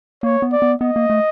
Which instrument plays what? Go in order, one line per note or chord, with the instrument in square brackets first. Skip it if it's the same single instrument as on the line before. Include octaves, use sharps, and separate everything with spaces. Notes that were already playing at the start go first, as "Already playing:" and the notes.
[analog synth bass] A#3 [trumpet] C#5
[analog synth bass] B3
[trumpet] D5
[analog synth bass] B3
[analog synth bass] B3 [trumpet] D#5
[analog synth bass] A#3
A3